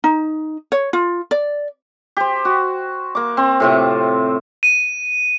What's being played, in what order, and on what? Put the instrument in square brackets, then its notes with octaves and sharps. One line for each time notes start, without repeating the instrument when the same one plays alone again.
[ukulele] D#4
C#5
F4
D5
[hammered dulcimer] G4 C5
F#4
A#3 D6
C4 C6
A2 C3 F4
[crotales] D#7